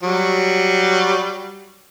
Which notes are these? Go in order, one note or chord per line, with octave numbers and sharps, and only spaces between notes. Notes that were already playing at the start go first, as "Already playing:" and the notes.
F#3 G3